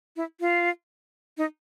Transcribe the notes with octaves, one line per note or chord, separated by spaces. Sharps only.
E4
F4
D#4